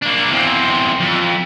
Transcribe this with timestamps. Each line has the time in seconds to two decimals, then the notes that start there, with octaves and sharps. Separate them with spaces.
0.02 A#3 D4
0.31 E2 C4
1.01 F2